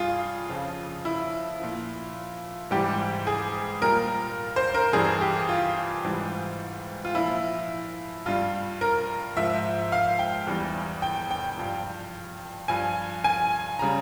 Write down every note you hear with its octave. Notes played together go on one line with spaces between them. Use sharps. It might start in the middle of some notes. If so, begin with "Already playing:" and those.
Already playing: G2 G3 F4 G#4
F2 C#3 F3
E4
A#2 F3
G#2 E3 G3 G4
G#4
A#2 G3 A#4
C5
A#4
G2 E3 G3 G#4
G4
F4
G#2 E3 G3
F4
A#2 F3 E4
G2 G3 F4
A#4
G#2 F3 E5
F5
G5
E2 E3 G3
G5
G5
G2 F3
G2 F3 G#5
G#5
C#3 G3 A#5